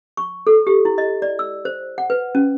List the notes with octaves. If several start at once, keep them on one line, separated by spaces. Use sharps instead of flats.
C#6
A4
G4
E4
D#5
D5
E6
C5
F#5
B4
C#4